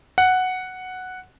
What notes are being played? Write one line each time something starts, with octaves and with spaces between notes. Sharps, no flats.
F#5